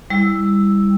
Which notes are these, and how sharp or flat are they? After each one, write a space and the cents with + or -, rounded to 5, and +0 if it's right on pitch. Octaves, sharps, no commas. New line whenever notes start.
G3 +25 E4 -10 E6 +0